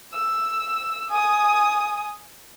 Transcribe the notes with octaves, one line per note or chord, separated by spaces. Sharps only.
E6
G#5 D#6